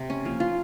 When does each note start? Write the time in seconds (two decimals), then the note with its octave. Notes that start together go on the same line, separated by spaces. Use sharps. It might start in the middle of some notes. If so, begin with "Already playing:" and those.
Already playing: C3
0.10 C#4
0.25 F3 A#3
0.40 F4